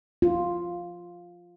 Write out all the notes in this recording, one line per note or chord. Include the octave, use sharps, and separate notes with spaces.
F4